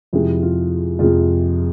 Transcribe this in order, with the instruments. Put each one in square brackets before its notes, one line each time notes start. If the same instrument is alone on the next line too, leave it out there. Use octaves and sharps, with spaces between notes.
[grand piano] F2 C3 F3 G#3 E4 G4
F4
F2 C3 F3 G#3 F4 G#4